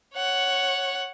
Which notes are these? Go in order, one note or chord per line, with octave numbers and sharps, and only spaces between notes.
C#5 F#5